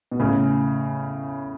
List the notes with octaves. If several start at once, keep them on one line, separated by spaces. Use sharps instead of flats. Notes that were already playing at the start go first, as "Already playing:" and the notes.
B2
A2 C#3